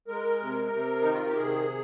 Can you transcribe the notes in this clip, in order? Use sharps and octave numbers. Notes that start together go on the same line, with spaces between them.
G#3 A#4
C3
C3
D#3 D#4
F4
G4
C3 G#4